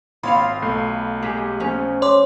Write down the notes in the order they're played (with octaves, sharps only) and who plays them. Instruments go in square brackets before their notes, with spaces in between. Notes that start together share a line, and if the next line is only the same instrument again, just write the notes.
[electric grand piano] G#1 [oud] F4 C#5 F5 [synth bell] B5
[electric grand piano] B1 A3 C7
[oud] G#3 G4 G#4
F3 C#4
[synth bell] C#5 C6 D6